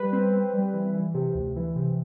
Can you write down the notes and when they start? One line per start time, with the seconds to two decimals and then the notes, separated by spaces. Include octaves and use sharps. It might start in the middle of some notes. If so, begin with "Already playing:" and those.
Already playing: G3 B4
0.12 C4
0.33 C4
0.54 G3
0.74 E3
0.94 E3
1.14 C3
1.35 D2
1.56 E3
1.76 C3